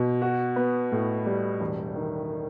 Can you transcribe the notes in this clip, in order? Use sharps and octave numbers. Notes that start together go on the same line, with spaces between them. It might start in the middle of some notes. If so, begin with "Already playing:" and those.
Already playing: B2
F#4
B3
A2
G3
E1
D#3